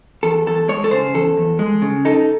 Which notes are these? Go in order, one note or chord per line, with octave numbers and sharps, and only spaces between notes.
E2 A4
E2 A4
G#3 C#5
A4
C#3 C5
E2 A4
E2
G#3
C#3
D#4 A4